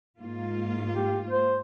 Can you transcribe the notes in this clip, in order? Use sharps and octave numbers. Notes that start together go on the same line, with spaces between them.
G#2 A#3 F4
G4
C5